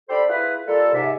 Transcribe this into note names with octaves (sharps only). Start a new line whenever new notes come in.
D4 G4 A4 C5 B5
E4 F4 G#4 B4
G3 A#3 F4 A4
G#2 C3 E5